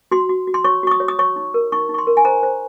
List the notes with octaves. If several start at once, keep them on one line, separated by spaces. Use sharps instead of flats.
F#4 C6
F#4
F#4
C6
C#5 C#6
F#4 C#6
D#6
C#5
D#6
C#5 C#6
D#4
A#4
D#4 C#6
D#4
C#6
C6
A#4
G#5
C5 A#5
C5